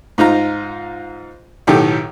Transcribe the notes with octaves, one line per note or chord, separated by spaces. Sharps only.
G#2 D#4 F4 A#5
B1 A2 D#3 G4 A4